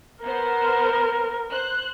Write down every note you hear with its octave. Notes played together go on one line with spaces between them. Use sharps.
B3 A#4 C5
C5 F#6